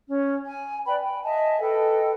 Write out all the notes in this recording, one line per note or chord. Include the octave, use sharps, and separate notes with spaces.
C#4
G#5
B4 D5 G5 B5
G5
D#5 E5 G#5 A5
A4 B4 D#5 G5